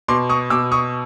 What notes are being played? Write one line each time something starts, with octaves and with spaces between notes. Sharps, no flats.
B2 C6 D6
C#6 D#6
B2 D6 E6
C#6 D#6